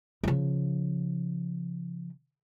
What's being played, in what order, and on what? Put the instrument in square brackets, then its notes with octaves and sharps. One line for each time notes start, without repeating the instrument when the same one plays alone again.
[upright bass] C#3 F3